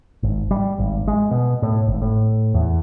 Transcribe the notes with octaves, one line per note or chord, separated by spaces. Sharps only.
G#1
G3
G#1
G#3
B2
A2
G#1
A2
E2